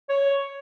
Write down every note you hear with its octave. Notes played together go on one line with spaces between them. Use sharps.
C#5